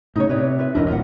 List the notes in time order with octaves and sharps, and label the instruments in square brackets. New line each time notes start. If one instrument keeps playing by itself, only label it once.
[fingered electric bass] A2 C#3 [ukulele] D#4 C#5
[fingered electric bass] C3 [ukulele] B4 C#5 D5
[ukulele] F4 B4 E5
[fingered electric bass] A1 E2 D4 [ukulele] E4 A#4 D#5
[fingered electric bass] D#1 A#2 [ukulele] F4 A#4 F#5